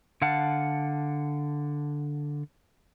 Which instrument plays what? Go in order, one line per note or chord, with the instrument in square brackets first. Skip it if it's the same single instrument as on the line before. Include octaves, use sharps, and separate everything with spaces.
[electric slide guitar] D3 F5 F#5 A5